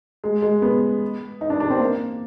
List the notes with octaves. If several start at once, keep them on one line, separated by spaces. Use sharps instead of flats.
G#3
G#3
B3
D#4
D4
D4
C4
A#3